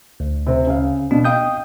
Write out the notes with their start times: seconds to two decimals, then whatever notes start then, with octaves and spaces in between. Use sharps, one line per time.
0.20 D2
0.47 C3 C4
0.67 C#3 F5
1.11 B2 D4
1.25 D#5 F5 G5 D#6 G6